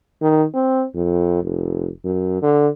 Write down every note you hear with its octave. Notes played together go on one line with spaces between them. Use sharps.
D#3
C4
F2
F1
F#2
D3